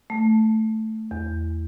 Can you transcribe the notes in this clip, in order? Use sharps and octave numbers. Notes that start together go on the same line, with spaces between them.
A3
E2